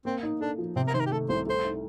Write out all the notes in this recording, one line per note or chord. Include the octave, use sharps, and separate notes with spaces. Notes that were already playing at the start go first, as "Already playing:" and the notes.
A#3 C4
D#4
D4 A4
F3
C3 C4
A#4
D#3 C5
A#4
G4
A3 A4
C2 C5
A3 C5
D#4